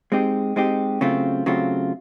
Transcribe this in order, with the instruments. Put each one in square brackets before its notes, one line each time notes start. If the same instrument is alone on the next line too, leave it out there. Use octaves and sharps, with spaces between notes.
[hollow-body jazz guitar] G#3 C4 D#4 G4
G#3 C4 D#4 G4
C#3 F#3 A3 C4 F4
C#3 F#3 A3 C4 F4